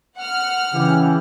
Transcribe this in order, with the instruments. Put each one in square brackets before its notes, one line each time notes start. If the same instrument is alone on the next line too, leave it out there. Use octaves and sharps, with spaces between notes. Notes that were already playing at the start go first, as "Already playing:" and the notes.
[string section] F#5 F6
[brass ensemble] C#3 E3 G4